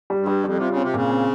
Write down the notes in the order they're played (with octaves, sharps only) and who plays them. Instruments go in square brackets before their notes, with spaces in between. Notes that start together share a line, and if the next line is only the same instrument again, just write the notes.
[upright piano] G3
[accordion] G2
[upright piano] G3
[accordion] F2 [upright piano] G3
[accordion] C3
[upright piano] F4
[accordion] C#3
[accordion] C3 [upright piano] C4
[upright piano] A#2 [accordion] C#3
[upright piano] C4